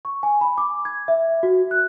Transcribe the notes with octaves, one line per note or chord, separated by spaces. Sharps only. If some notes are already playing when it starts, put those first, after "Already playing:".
C#6
G#5
B5
D6
G#6
E5
F#4
F#6